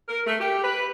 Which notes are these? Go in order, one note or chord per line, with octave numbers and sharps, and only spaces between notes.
A#4
A3
G4
B4